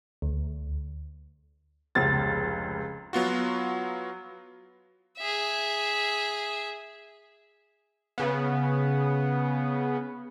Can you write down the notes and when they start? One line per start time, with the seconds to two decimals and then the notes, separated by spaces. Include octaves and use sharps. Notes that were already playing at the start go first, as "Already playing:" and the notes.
0.22 D2
1.95 F1 C#2 A6
3.13 F#3 B3 F4 F#4
5.17 G#4 E5
8.18 C#3 B3